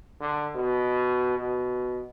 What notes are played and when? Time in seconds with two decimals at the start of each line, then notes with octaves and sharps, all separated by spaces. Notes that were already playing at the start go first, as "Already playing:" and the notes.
0.20 D3
0.55 B2
1.38 B2